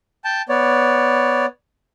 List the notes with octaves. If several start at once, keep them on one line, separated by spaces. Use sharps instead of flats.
G5 A5
B3 C#5 D5